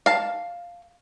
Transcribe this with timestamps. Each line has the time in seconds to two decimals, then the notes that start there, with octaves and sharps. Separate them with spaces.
0.06 F5 A5